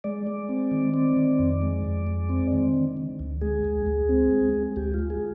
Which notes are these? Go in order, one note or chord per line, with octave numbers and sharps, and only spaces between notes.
G#3 D5
G#3
C4
D#3
C4
D#3
F2
G#3
F2
G#3
C4
D#3
D3
D3
D2
G#3 G#4
D2
D2
C4
G#3
G#3
D2 G4
F4
G#3
G#4